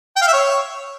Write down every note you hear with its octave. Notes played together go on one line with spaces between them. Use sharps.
G5
F5
E5
C#5